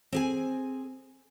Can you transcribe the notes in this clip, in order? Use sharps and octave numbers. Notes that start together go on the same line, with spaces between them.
C4 G#4 G#5